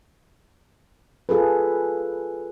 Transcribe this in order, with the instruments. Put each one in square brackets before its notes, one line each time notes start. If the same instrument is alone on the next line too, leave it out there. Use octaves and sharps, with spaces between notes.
[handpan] F4 G#4 A4 B4